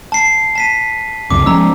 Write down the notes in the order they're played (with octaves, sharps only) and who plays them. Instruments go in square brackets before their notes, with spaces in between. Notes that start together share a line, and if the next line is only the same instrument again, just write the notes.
[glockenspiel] A5 C7
A5 B6 D#7
[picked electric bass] C#2 F#2 C3 [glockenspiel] D6
[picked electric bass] F3 G#3 C#4 [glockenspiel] A#5 E6